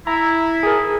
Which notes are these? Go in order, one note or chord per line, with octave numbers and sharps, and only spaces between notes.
E4 A#5
G#4 A#4